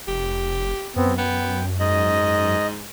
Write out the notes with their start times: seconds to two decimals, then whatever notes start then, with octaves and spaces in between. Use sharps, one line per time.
0.08 F1 G4
0.96 F#2 B3 C4
1.18 B3 G5
1.80 G#2 D#5